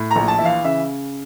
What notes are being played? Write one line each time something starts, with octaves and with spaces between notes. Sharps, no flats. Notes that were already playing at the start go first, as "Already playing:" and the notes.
Already playing: A2
A#5
A#1
A5
E3 E5
F5
C#3 E5